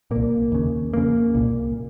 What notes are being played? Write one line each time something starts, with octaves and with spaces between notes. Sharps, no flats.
C2 A#2 A#3
D#2 C#3
F2 C#3 A#3
C2 A#2